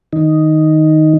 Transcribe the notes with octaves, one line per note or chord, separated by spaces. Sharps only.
D#3 D#4